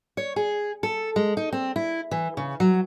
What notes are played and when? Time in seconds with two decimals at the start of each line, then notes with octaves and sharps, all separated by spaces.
0.17 C#5
0.36 G#4
0.83 A4
1.16 G#3
1.37 D#4
1.53 C4
1.76 E4
2.11 E3
2.37 C#3
2.60 F#3